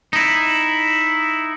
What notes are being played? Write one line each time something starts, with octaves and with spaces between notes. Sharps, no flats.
D#4 E4